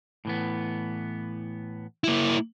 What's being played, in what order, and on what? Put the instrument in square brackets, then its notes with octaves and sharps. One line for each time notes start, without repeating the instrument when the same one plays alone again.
[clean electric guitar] A2 E3 B3
[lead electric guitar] A#3 E4